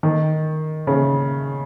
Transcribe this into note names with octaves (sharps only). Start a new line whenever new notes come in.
D#3
C#3